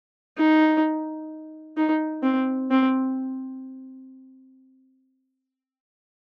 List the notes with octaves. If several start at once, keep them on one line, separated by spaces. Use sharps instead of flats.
D#4
D#4
C4
C4